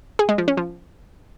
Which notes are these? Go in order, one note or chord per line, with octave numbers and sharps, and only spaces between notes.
G#4
G#3
F3
C#4
F3